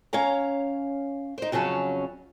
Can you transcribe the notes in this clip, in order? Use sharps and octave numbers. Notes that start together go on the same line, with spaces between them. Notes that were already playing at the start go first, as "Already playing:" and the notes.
C#4 C#5 F5 A#5
D#4 C5
F2 C#3 F#3 C#4 A5